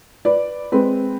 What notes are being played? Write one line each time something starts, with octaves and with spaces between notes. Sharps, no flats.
B4 D5
G#3 C4 B4